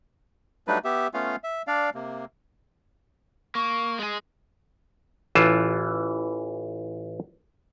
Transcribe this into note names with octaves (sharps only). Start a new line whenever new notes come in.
F#3 G3 A3 D4 D#4 B4
B3 G4 E5
A3 B3 C#4 F4 F5
E5
D4 D5 F5
C3 A#3
A#3 C#6
G#3 G#4
A1 E3 F4 A5